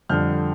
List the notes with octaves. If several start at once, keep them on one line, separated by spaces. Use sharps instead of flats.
F2 D3 G3 F6 G6